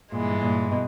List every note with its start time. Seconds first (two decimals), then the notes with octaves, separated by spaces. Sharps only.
0.12 G2 A#2 E3 G#3
0.41 A#2
0.71 B2